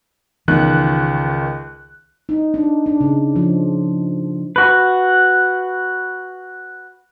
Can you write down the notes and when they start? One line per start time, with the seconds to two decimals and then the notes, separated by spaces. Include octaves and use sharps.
0.48 C#2 D#3 E3 B3 F#6
2.29 D#4
2.54 D4
2.86 D4
3.01 C#3
3.36 F3
4.56 F#4 B4